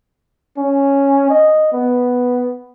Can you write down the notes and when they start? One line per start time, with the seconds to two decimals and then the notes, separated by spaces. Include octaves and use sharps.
0.57 C#4
1.30 D#5
1.72 B3